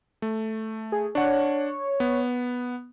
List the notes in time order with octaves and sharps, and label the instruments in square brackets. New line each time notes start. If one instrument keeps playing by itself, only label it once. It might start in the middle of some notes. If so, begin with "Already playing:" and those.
[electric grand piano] A3
[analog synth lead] G#4
[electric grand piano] D4 F#5 [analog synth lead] C#5
[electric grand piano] B3